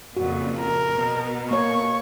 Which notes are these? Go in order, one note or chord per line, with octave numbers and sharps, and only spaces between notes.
F2 A#2 C#3 F#4
A#4
B2
A#3 C#5 C#6